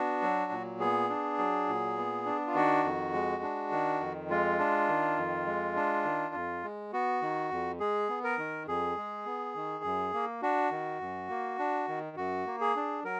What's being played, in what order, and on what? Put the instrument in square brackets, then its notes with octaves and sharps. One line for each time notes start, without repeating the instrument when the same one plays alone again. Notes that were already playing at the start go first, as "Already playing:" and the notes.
Already playing: [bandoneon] B3 D4 F#4
F#3
A#2
B3 G#4
D4
F#3
A#2
B3
D4
F4
D#3 F#4
F2
G#3
D4
D#3
F2
G#3 F4
D4
D#3
F2
G#3
D4
D#3
F2
G#3
B3 F#4
D#3
F2
G#3 G#4
B3
A#4
D#3
F2 G#4
G#3
B3
D#3
F#2
A#3
D4 F#4
D#3
F#2
A#3
D4
D#3
F#2 F#4
A#3
G#4
D4
F#3 A#4